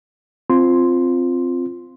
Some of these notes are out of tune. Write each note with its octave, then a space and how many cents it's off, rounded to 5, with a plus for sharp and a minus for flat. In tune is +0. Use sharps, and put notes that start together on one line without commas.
C4 +0 F4 +0 C6 +0